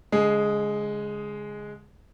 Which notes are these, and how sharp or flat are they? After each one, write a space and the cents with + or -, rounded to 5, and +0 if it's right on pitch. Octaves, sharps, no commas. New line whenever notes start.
D3 -45 G#3 +0 G#4 +0